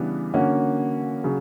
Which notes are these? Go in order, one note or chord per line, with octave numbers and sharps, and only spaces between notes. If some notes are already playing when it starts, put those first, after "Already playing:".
Already playing: C#3 E3 G3 B3 D4
D3 A#3 C#4 F#4
C#3 F#3